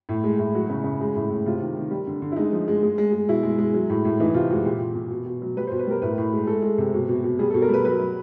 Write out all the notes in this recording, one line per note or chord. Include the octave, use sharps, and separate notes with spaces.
A2
G#3
A2
F#3 F#4
C#3
C#3
G#3
A2
A2
C3 F4
D#3
D#3
G3
D3
D3
E4
G#3 D#4
F3
G#3
G#3
G#3
G#3
B2 E4
G#3
G#3
F#3
A2
A2
E3 D#4
C3 F4
G#3 F#4
A#2 G4
A#2
A#2
B2
B2
F#3
G3 B4
C5
B2
B4
G3 A#4
A2 B4
A2
G#3
G#3 A4
G#3
C3
B2
B2
B2
G3 G#4
A4
B2
A#4
G3 B4
F#3 B4
F#3